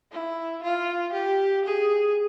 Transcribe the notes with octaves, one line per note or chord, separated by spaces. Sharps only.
E4
F4
G4
G#4